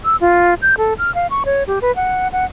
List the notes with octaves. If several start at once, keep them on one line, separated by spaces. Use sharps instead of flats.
E6
F4
G6
A4
F6
F5
C#6
C#5
G4
B4
F#5
F#5